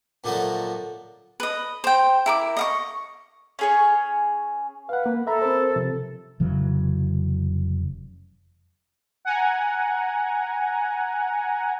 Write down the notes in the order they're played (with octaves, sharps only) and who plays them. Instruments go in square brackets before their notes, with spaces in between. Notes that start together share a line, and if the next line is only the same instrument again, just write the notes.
[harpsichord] A#2 D3 F3 F#3 A3
[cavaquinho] B4 D#5
C5 G5
E4 A#4 D6
D#5 F5 C#6
[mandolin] C#4 G#4 C#5
[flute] B4 [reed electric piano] F5 F#5
[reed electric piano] A#3
[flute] A4 [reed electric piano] E5 A#5 B5
[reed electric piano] C4 A#4 C5
C3 F3
[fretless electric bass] F1 C#3 E3 F#3
[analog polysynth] F#5 G#5 A#5